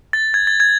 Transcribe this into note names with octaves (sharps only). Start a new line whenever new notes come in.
A6
G#6
A6
G#6